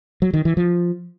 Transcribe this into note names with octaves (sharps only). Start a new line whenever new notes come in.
F#3
D#3
E3
F3